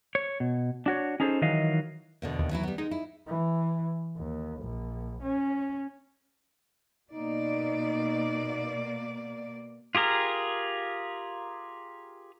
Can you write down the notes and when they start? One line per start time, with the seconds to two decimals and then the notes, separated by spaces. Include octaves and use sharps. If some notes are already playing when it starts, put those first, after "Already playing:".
0.15 C#5
0.40 B2
0.86 D4 F#4 C#5
1.20 C#4 D#4 G#4 A4 C5
1.42 D#3 E3 F#3 D#5 F5
2.22 E2 B2 D3
2.39 D#2
2.51 E3 F#3 E4
2.63 G3 B3
2.78 G#3 D#4
2.91 E4
3.27 E3
4.16 D#2
4.62 A#1
5.23 C#4
7.13 B2 A#3 D#4 D5
9.95 F4 G4 G#4 A#4